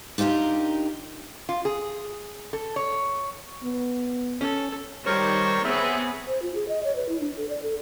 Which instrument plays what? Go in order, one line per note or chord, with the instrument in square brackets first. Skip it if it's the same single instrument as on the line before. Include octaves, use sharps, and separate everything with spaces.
[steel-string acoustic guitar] D4 D#4 F4 G4 A#4
[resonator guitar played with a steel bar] F4
G#4
A4
C#5
[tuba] B3
[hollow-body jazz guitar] C#4 [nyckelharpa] A4
[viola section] D#3 G3 C5 [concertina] A#4 C#5 C#6
[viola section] B3 C4 G#4 [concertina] E5
[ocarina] C5
F4
G#4
D#5
C#5
B4
E4
D4
A4
D5
A4